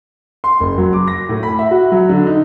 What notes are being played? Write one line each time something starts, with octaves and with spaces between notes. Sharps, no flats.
C6
F#1
F#3
D6
A#6
A2
B5
E5
F#4
F#3
D3
D#4